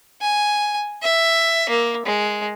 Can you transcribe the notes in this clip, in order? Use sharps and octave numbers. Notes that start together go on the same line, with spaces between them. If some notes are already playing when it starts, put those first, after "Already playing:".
G#5
E5
A#3
G#3